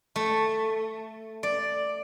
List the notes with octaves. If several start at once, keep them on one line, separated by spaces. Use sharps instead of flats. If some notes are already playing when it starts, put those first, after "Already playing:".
A3
D5